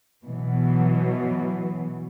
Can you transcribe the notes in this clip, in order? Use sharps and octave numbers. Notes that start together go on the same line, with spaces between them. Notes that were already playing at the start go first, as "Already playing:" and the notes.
B2 E3 F#3